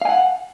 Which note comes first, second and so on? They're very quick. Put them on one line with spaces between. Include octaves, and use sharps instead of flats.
F5 G#5 F#5